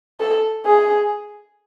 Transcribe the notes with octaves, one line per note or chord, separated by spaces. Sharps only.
A4
G#4